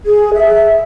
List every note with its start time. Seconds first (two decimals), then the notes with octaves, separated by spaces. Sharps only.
0.06 G#4
0.34 E5